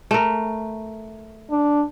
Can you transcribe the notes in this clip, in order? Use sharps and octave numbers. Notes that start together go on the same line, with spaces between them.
A3 A#4
D4